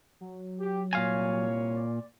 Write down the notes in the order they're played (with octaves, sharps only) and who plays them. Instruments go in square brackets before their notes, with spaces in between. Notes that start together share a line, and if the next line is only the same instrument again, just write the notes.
[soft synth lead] F#3
[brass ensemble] G4
[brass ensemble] C2 C#5 [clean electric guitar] A#2 F5 G#5
[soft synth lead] D5